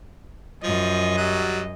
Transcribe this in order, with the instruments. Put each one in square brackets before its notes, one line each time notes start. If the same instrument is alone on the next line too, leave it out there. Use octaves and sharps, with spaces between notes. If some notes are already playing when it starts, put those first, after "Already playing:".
[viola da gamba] F#2 D#5 [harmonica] F3
[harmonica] F#3 G3